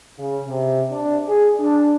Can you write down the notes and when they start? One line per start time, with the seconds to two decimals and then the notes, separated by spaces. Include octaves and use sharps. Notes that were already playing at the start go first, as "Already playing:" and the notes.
0.19 C#3
0.48 C3
0.92 D4
1.28 G#4
1.60 D4